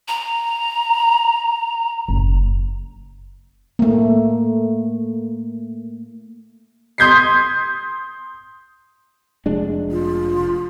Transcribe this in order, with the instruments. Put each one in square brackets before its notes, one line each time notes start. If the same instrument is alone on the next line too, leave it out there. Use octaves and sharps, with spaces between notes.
[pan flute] A#5
[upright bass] F#1
[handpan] A3 A#3
[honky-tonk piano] C6 D#6 G6 G#6 B6 C7
[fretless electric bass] F1 G#3 D4
[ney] F4